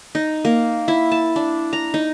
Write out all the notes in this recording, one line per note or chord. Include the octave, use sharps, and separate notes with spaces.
D#4
A#3
E4
A5
D4
A#5
D#4